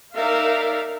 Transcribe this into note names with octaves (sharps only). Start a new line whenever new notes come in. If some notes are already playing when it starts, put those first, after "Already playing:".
D#4 A#4 D5 E5 F5